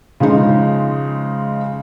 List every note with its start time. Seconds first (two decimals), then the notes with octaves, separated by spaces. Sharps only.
0.20 C#3 F3 G#3 D#4